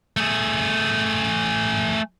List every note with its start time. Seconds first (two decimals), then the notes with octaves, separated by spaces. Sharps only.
0.17 A3 G#4